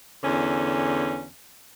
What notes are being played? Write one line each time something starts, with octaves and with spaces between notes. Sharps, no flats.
E2 D3 C#4